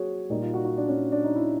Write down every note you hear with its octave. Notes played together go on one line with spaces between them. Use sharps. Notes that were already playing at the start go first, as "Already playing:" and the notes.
Already playing: F#3 A#3 F#4 G#4 C#5
A#2 G3 A#3 D#4
F4
F#4
F#4
D4
C#4
D4
D#4
E4